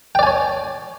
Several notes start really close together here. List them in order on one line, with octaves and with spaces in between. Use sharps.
G5 D5 G#5 C#5